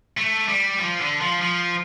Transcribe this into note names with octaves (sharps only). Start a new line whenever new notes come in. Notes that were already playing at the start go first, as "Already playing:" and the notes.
A3
G3
F3
D3
F3
F3